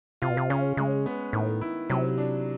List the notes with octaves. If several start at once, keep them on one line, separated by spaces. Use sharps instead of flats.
C3 F4
B2
C3
C#3 C#4
C#3 G#3
B3
A2 D#3
E4
C3 F#3
D4